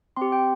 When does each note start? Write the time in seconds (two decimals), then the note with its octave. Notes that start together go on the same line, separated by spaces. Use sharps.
0.17 C4 G4 C6
0.32 G5